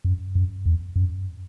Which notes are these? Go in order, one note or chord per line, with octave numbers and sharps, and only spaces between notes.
F#2
F#2
E2
F#2